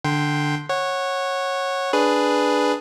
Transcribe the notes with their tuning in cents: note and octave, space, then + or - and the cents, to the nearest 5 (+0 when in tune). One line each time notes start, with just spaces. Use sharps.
D3 +5 G5 +0 C6 +0
C#5 -15 F#5 +0
D4 +0 G#4 +0 B4 +0